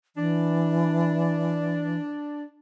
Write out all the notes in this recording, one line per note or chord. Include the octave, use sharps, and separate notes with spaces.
E3 D4